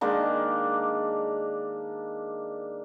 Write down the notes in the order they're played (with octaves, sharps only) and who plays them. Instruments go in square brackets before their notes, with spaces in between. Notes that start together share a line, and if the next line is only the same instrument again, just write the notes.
[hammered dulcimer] D#3 G#3 A#3 D4